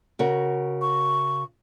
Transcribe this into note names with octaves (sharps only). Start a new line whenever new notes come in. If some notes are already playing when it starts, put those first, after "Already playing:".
C#3 F#4 A#4
C#6